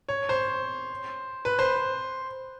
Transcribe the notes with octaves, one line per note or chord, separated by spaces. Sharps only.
C#5
C5
B4
C5